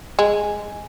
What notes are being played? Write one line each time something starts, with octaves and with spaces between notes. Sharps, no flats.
G#3